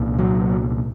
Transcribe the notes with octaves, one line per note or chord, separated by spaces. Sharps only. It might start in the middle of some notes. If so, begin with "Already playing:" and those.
Already playing: C2 A#2
F#3